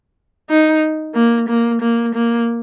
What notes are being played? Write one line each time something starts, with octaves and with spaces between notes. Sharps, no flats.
D#4
A#3
A#3
A#3
A#3